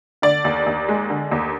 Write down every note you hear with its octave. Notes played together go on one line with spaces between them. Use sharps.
D3 D5
D#2
D#2
G#3
D3
D#2